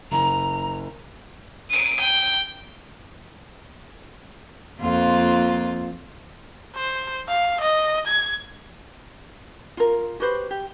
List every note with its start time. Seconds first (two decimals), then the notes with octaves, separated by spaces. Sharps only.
0.12 F#1 A#5
1.71 D7 D#7
2.00 G5
4.81 F2 A#3 F4
6.75 C5
7.28 F5
7.61 D#5
8.07 G#6
9.77 F4 A#4
10.20 F#4 G4 B4 C5
10.51 G4